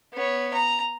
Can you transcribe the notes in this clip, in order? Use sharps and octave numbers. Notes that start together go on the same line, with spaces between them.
B3 C#5
A#5